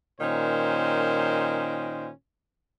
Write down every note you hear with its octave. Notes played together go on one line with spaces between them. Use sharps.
A#2 D#3 C#4 C5